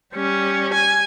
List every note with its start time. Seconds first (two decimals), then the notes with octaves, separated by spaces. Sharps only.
0.14 G3 C#4
0.74 G#5